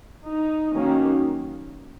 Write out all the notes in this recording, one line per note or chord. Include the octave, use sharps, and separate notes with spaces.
D#4
D#3 F#3 A#3 C#4